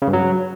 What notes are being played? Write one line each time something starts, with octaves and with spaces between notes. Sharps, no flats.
C#3
G2
F#3